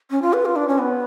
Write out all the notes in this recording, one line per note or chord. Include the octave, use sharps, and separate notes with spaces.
C#4
F4
B4
F4
D4
C#4
B3